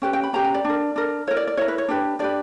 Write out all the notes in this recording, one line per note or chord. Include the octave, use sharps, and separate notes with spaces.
C#4 G4 B4 G5
G5
B5
C#4 G4 B4 A#5
A#5
D5
D4 A#4
D4 A#4
E4 A#4 C#5
D5
D5
E4 A#4 C#5
B4
C#5
D4 G4 B4
D4 G4 B4 D5